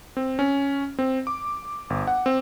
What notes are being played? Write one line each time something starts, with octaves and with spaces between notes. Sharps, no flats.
C4
C#4
C4
D6
G1
F#5
C4